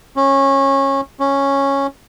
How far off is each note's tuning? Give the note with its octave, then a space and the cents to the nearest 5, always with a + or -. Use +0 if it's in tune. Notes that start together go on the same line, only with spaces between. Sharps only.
C#4 -20
C#4 -5